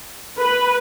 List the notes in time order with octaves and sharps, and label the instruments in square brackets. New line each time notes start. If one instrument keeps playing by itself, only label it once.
[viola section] B4